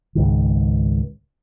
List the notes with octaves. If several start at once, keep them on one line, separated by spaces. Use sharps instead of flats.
C#2 G#2 D#3